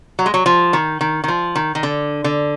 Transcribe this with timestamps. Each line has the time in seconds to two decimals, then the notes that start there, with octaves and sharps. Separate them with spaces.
0.19 F#3
0.26 G#3
0.34 F#3
0.46 F3
0.73 D#3
1.01 D#3
1.24 D#3
1.28 F3
1.55 D#3
1.75 D#3
1.83 D3
2.24 D3